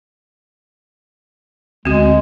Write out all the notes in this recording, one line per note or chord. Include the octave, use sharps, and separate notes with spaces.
D2 G#3 C4 F#4